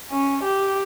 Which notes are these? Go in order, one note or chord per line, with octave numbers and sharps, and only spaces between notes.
C#4
G4